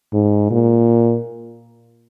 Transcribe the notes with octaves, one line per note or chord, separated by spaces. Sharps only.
G#2
A#2